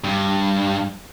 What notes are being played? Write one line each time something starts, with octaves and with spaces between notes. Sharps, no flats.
G2